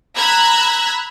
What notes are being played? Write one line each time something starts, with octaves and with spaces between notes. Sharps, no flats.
A#5 B5 E6 F#6 G#6 B6